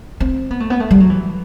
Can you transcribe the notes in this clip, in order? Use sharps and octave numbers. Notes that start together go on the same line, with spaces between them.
C4
B3
A3
B3
A3
G3
F#3
E3